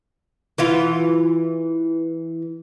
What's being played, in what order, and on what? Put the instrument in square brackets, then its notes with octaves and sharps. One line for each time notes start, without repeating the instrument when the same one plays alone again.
[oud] E3 E4 F4